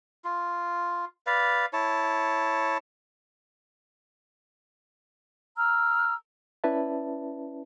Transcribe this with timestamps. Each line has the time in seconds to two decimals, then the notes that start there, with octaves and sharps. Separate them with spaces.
0.24 F4
1.27 B4 D5 F5
1.73 E4 C#5 A5
5.57 A#5 E6 F6
6.64 C#4 E4 B4 D5 E5 A5